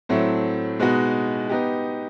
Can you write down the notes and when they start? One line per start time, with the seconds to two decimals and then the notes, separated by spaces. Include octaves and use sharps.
0.09 A2 F#3 A3 C4
0.79 B2 G#3 B3 D#4 F#4
1.49 B3 D#4 G4